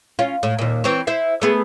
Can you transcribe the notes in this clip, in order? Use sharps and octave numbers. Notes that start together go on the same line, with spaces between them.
C#4 F4
A2
D#2 A#2
E3 C4 C#5
E4 C5 E5
A3 B3 G#4